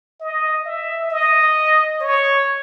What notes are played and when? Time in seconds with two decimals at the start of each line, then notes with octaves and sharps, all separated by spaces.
0.21 D#5
0.66 E5
1.11 D#5
2.01 C#5